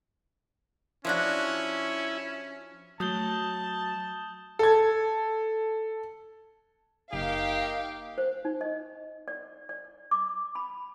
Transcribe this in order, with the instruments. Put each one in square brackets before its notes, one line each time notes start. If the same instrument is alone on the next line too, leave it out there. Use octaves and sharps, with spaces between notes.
[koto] F3 D4 F#4 [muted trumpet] C#4 [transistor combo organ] E4
[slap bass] F#3 [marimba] A3 F#4 [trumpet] A5 [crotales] D#6 G6 G7
[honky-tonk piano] A4 G#6
[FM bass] F#1 [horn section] A#3 D#4 G4 [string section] F5 G5
[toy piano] C5
D#4
D#5
D5
D5
D6
B5